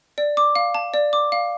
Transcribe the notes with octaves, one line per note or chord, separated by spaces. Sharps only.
D5
D6
F5
A5
D5
D6
F5